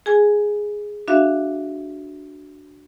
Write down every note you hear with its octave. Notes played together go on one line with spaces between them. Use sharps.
G#4 G#5
D4 F#4 E5 F5